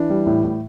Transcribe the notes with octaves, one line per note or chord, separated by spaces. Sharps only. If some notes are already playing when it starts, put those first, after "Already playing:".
Already playing: E3 D4
G3
A2
A2